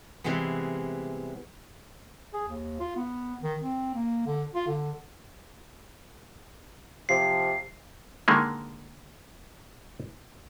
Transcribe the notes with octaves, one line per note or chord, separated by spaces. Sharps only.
C3 E3 G3 G#3 B3
G#4
D#2
F4
B3
D#3
C4
A#3
D3
F4
D3
C3 F3 C7
D3 D#3 G#3 A#3